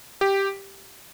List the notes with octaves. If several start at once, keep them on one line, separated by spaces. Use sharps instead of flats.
G4